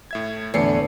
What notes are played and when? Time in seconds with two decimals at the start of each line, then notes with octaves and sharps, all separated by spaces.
0.11 A2 E5 G#6
0.54 E2 A2 D3 A3 C7 C#7